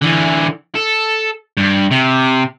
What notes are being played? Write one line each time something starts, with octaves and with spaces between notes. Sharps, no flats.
D3 E3
A4
G2
C3